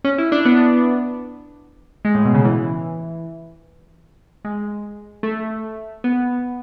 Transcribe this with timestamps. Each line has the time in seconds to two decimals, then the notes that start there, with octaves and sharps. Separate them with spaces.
0.04 C#4
0.18 E4
0.32 D4
0.45 B3
2.05 G#3
2.15 A2
2.25 B2
2.35 C#3
2.44 E3
4.45 G#3
5.23 A3
6.04 B3